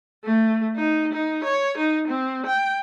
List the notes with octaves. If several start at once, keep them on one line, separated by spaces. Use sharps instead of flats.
A3
D#4
D#4
C#5
D#4
C4
G5